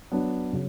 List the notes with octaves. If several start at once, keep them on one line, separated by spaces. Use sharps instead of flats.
F#3 B3 D4
C#3 F#3